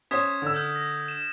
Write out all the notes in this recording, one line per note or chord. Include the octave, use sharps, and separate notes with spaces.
C#4 C5 C#5 D#6 G#6 B6
D3 E6
F6 G6
A#6
E7